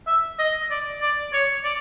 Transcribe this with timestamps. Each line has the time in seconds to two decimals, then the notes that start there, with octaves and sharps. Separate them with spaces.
0.07 E5
0.39 D#5
0.70 D5
1.01 D5
1.33 C#5
1.64 D5